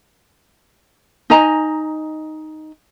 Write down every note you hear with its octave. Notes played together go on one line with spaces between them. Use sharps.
D#4 D#5 G#5 A#5